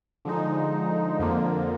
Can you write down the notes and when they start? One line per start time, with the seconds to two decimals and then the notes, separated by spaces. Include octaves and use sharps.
0.25 D3 F3 G#3 D#4
1.19 F2 D3 F3 A#3